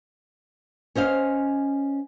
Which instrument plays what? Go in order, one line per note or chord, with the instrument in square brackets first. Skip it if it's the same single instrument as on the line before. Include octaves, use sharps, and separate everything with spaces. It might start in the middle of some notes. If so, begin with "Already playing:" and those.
[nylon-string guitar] C#4 C5 D#5 F5